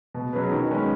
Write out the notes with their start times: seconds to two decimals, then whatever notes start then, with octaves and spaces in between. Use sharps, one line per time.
0.14 B2
0.33 F#3 C#4 G#4 B4
0.51 D#3
0.71 G#3 C#4 B4